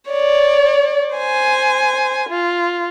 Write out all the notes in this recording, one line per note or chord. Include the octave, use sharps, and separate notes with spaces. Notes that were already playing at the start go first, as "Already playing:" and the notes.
C#5 D5
C5 G#5
F4